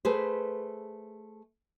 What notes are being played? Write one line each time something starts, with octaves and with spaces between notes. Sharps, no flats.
A3 G#4 B4 C5